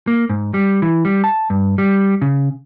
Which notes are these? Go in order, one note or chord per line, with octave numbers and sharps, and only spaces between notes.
A#3
G#2
G3
E3
G3
A5
G2
G3
C#3